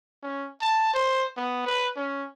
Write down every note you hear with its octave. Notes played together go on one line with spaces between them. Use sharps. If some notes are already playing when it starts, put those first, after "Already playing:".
C#4
A5
C5
B3
B4
C#4